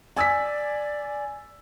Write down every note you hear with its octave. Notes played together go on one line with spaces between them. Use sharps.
D5 G#5 E6 B6